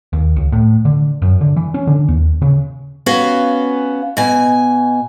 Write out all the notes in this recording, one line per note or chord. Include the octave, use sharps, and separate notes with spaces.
D#2
C#2
A2
D3
F#2
D3
E3
C#4
D3
D#2
C#3
B3 C#4 F#4 F5
B2 G#5